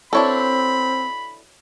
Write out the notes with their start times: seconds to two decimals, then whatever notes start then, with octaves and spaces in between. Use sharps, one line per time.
0.13 B2 C4 D4 E4 A4 C#5 B5